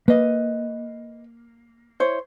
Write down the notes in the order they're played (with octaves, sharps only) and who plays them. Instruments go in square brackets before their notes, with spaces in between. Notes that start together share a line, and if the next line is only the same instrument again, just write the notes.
[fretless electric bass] A#3 [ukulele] B4 D#5
[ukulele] E4 C5 C#5